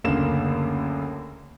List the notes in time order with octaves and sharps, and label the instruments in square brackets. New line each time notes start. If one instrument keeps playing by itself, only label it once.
[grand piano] F#1 D2 A#3 E7